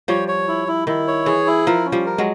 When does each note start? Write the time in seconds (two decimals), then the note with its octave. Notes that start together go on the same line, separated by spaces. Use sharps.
0.08 F3 G3 C#5
0.28 C#5
0.48 E4
0.68 E4
0.87 D#3 E4
1.08 C#5
1.26 E3 G#4
1.47 E4
1.67 F3 A#4
1.85 C#4
1.92 F3 G3
2.06 A#4
2.18 F#3 G#3